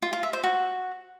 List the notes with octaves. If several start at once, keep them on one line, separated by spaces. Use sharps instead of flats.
F4
F4
E5
C5
F#4